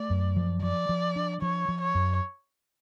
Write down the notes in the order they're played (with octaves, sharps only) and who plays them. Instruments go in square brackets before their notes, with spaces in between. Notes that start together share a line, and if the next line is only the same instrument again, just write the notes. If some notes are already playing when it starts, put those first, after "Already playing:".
Already playing: [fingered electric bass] A3 [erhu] D5
[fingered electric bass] F#2
F3
[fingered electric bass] F3 [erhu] D5
[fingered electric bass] F3
D4
[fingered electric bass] F3 [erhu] C#5
[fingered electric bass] F3
[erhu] C#5
[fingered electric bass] F#2